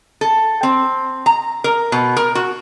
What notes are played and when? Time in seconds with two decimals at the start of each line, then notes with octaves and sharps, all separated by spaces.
0.21 A4
0.63 C4
1.26 A#5
1.64 A#4
1.92 B2
2.17 A#4
2.35 F#4